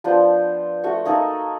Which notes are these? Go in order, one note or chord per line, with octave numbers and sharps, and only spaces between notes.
F3 B3 D4 C5
A3 F#4 C#6
A#3 D#4 G#4 A4